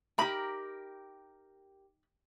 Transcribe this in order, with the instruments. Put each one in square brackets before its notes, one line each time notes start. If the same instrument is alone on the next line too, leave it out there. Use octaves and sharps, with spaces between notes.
[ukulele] D#4 B5 [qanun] G4 A#4